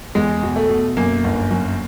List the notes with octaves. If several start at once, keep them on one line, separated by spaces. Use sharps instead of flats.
E2 G#3
B2
A3
B2
F#2 A#3
G1
F#2